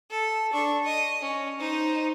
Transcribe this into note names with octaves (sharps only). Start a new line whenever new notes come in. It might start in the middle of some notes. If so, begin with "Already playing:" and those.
A4
D4 C#6
D#5
C#4
D#4 C5